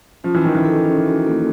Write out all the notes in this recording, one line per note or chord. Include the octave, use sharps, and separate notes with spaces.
F3 C#4
E3
D#3 C#4
E3
A4
C#4
F#4
A#3